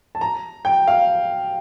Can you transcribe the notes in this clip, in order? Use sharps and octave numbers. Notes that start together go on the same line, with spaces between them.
A5
A#5
G5
F5